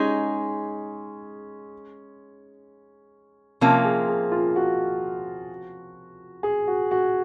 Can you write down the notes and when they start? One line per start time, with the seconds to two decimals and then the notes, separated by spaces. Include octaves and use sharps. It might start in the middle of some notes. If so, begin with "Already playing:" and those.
Already playing: G#3 C#4 D#4 G#4
3.61 C3 F3 A#3 C#4
3.85 G#4
4.08 G#4
4.32 F4
4.56 F#4
6.43 G#4
6.67 F#4
6.91 F#4